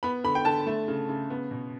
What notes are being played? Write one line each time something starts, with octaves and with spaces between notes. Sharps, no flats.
B3 B5
D3 B5
G5
D3 A5
A3
C#3
C#3
B3
B2